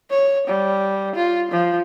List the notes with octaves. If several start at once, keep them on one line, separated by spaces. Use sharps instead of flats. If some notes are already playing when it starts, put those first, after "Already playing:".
C#5
G3
F4
F3